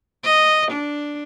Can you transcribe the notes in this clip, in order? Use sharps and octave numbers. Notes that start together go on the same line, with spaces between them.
D#5
D4